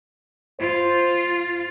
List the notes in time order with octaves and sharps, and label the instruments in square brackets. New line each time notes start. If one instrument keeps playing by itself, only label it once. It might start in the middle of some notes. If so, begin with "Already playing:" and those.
[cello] F4 [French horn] C5